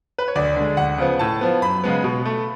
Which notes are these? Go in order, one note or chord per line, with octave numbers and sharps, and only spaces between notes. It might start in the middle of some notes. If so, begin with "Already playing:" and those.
B4
C#5
D2 D5
D3 G#3
D2 F#5
C#3 F3 B3
A2 A5
F3 B3
F#2 B5
C#3 G#3 B3
B2
A3